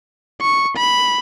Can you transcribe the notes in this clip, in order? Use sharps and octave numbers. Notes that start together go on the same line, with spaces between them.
C#6
B5